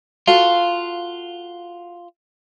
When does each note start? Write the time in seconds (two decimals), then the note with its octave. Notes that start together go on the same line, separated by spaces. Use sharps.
0.27 F4 F#4 A4 F5